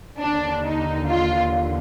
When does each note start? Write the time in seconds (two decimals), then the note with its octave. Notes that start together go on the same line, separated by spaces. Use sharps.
0.19 D#2 D3 D4
0.64 D#4
1.08 F4